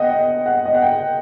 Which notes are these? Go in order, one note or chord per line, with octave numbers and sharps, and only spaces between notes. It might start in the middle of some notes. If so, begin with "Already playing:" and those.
Already playing: D#5 F#5 G5
D#5
F#5
D#5
F#5
G5